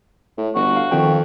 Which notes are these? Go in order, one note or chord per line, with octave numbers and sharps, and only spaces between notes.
A2
G1 F#4
F5
F2 D#3 G5